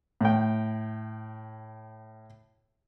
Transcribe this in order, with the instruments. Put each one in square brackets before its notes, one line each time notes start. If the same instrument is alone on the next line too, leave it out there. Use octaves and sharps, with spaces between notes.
[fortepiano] A2 G5